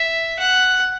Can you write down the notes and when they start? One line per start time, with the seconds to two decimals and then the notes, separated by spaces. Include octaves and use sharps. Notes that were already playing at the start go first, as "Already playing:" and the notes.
Already playing: E5
0.39 F#5